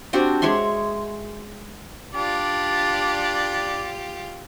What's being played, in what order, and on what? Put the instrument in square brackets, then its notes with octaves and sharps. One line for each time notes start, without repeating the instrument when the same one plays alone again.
[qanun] C4 D4 F#4 G4
G#3 C#5 E5 C6
[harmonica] D4 D5 [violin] F4 G4